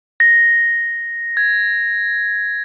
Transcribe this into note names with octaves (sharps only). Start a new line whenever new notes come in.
A#6
G#6